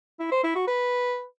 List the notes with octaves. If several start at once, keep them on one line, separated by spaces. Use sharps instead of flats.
E4
C5
E4
F#4
B4